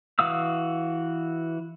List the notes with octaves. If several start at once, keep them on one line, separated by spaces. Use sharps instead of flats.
E3 F#4 F5 D#6 E6